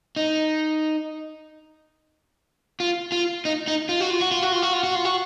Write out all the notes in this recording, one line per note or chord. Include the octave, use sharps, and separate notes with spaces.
D#4
F4
F4
D#4
D#4
F4
F#4
F4
F#4
F4
F#4
F4
F#4
F4
F#4
F4
F#4